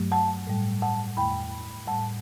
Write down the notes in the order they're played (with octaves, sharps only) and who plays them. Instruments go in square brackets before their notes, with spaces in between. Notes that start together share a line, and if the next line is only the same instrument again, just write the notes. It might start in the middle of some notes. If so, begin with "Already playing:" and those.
Already playing: [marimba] G2 F#3 A3
F#5 A5
A2 G3
F#5 A5
E2 D3 A3 G5 B5
A2 G3 F#5 A5